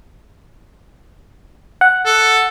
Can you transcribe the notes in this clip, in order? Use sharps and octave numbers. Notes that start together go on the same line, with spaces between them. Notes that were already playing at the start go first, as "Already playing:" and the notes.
F#5
A4